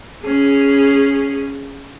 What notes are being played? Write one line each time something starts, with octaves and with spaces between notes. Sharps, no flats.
C#4 G#4